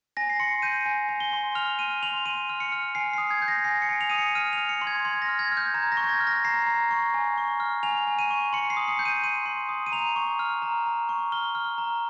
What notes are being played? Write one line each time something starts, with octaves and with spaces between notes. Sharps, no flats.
G#5 A#6
C7
C6 C#7
G6 D#7
G#5
G#5
G7
C6
F6 F7
F6 D#7
C6 F7
C6 D#7
F6
C#7
F6
G#5 C7
D#6 C7
G#6
G6
A#6
G#5 C7
C#7
G#5
F7
D#6 D#7
C#7
F6 D#7
F6 F7
C#7
C6
G#6
C6 G#6
A#6
F6
G#6
F6
G6
A#5 G#6
A#6
C#6
G6
G#6
F6
A#6
A#5 C7
A#5
C#6
G#5
C#6
F6
G#5 F7
G#5
D#7
C#6
C6 C#7
C7
D#6
C#7
G6
D#7
C6 D#7
C6
D#6
D#7
A#5 F7
C#6
F6
A#5
A#5
C#6
F6 G7
F6
A#5